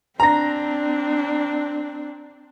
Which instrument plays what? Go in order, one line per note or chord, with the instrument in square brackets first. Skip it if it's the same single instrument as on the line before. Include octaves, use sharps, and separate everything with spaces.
[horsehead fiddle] C4 D4 [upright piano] A#5 A#6